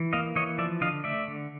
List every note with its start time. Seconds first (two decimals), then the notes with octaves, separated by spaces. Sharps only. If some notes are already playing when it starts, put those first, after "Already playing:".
Already playing: E3
0.13 A#3 D#5 F5
0.35 E3 C#5 D#5
0.58 F3 D5 E5
0.81 D3 D#5 F5
1.04 A3 D5 E5
1.28 D3